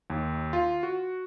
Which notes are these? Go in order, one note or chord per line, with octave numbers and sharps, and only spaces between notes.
D#2
F4
F#4